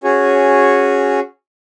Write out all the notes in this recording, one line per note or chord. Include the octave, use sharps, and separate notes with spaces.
C#4 F#4 G#4 C#5